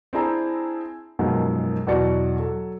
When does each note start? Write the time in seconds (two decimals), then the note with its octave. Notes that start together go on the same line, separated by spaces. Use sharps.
0.13 C4 D4 E4 G#4 A5 A#5
1.19 F#2 B2 D#3 F3 F#3 G#3
1.87 E2 B2 F#3 F#4 D5 C#7
2.39 F#3 A4